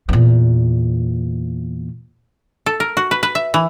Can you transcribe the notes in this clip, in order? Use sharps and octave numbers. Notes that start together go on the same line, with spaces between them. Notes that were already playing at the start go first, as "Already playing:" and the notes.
E2 A#2
A4
A#4
F#4
B4
B4
E5
E3